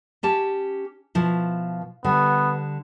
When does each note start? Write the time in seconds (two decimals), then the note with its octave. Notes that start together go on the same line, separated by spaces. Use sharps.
0.23 C#4 G4 A5
1.15 B2 F3 E4
2.04 D3 G3 B3